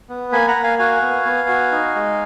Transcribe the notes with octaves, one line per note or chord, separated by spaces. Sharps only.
B3
A#3 G#5 B5
F#5 A#5
A#3
F5 G#5
F#4 F5 G#5
B3
B3
F#4
D#4
G#3